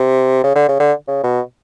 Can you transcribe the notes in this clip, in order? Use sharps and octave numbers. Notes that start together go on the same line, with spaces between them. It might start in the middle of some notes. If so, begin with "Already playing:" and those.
Already playing: C3
C#3
D3
C#3
D3
C#3
B2